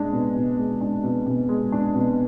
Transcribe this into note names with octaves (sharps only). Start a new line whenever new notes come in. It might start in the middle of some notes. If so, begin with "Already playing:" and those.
Already playing: G#3 D4
B2
B2
G#3
D4
B2
B2
G#3
D4
B2